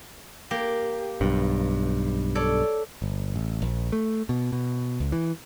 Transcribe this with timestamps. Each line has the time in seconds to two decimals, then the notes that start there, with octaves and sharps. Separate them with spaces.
0.51 A#3 G4
1.21 B1 G2
2.35 A4 C#5 D5
3.02 G1
3.36 A1
3.62 A#1
3.92 A3
4.29 B2
4.52 B2
5.00 C#2
5.12 E3